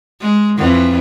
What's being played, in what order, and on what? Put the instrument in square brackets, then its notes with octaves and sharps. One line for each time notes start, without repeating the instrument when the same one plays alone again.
[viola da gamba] G#3
F2 E3